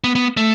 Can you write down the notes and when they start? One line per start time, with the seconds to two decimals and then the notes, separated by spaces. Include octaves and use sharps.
0.04 B3
0.15 B3
0.37 A3